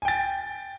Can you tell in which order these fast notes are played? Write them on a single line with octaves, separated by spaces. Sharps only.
G#5 G5 A6